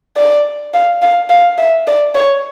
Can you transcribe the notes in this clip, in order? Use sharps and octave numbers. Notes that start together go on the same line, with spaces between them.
D5
F5
F5
F5
E5
D5
C#5